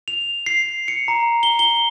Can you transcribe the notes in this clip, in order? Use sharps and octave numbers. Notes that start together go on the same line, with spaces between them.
F7
C7
C#7
A#5
G7
G7